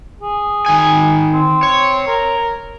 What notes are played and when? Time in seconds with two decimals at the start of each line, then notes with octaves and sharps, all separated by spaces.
0.21 G#4
0.66 D#3 G#5
1.34 C4
1.63 C#5
2.07 A#4